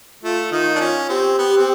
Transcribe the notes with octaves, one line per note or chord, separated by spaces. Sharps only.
A3 F4
D#3 D#4 F4
D4
C#4 F4
C4 G4
B3
C4